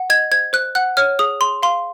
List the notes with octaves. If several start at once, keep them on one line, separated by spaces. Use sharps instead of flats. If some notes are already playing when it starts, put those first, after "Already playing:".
Already playing: F#5
D#5 G#6
C5 G#6
C5 F#6
F#5 F#6
C#5 F6
G#4 D#6
G#4 C6
F5 C6